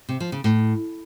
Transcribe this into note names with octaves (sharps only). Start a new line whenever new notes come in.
C3
F3
C#3
A2